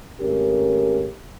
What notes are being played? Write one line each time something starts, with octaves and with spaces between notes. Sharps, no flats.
G#1 A3 C#4 G4 A#4